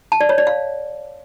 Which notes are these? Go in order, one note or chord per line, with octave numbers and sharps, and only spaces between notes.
A5
D5
C#5
D5
F5